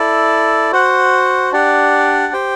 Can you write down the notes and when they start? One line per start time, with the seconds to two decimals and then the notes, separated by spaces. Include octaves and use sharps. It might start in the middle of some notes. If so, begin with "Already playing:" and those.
Already playing: E4 A4 D5
0.72 F#4 C5 F#5
1.52 D4 G4 D5 F#5
2.33 G4 C5 G5